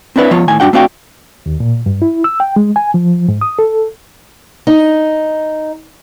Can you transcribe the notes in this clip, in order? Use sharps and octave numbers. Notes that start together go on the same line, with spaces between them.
C4 D4 E4 B4 C#5
F3 B3 F4 C#5
A2 D#3 G#5
G2 F#3 D4 F#4 F#5 G5
A3 C4 D4 F#4 F5 G5
D#2
A#2
G2
E4
E6
G5
G#3
G#5
F3
G#2
D#6
A4
D#4